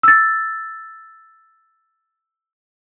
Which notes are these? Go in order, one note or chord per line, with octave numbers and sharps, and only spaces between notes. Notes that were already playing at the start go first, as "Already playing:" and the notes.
E6 A6